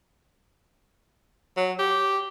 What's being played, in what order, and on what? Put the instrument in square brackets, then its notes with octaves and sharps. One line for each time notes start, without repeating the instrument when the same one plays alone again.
[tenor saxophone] F#3
G4